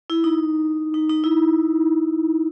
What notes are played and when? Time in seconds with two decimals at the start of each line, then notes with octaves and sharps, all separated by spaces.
0.10 E4
0.24 D#4
0.94 D#4
1.09 D#4
1.24 E4